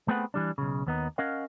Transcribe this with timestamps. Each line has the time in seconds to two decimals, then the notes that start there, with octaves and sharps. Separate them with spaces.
0.08 A3 B3 C4 G#4 B4 F#5
0.34 E3 G3 D4
0.58 B1 C#3
0.87 D#2 B3 D#4
1.18 C#4 A#4 D#5 F5 F#5